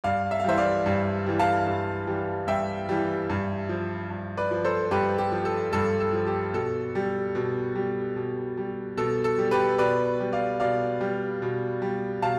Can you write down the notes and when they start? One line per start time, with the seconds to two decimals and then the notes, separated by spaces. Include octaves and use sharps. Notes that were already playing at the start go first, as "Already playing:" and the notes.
0.04 G2 D5 F5
0.31 E5
0.40 F5
0.44 E3 G3 C5 E5
0.58 D5 F5
0.86 G2
1.26 E3 G3
1.39 F5 A5
1.66 G2
2.07 E3 G3
2.47 G2 E5 G5
2.89 E3 G3
3.30 G2
3.69 F3
4.10 G2
4.37 B4 D5
4.51 F3
4.64 A4 C5
4.91 G2 G4 B4
5.18 G4
5.32 F3
5.45 A4
5.73 G2 A4
6.00 A4
6.13 F3
6.27 G4
6.53 B2 A4
6.95 G3
7.35 B2
7.75 G3
8.16 B2
8.57 G3
8.97 B2 A4
9.24 A4
9.38 G3
9.51 G4 B4
9.78 B2 B4 D5
10.20 G3
10.33 D5 F5
10.60 B2 D5 F5
11.01 G3
11.42 B2
11.82 G3
12.22 B2 F5 A5